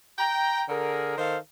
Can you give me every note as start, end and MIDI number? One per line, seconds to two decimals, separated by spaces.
0.18 0.64 79
0.18 0.64 82
0.68 1.14 50
0.68 1.14 68
0.68 1.14 70
1.18 1.38 51
1.18 1.38 69
1.18 1.38 72
1.18 1.38 77